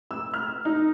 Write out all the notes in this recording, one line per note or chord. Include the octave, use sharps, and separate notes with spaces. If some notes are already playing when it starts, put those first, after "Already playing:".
E6
F6
D#4